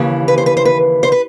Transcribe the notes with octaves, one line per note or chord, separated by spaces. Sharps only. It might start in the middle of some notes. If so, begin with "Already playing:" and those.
Already playing: D#2 C#3 E3
B4
C5
B4
C5
B4
C5
B4